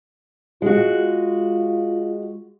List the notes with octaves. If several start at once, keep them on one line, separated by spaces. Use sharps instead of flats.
G#3 F4 F#4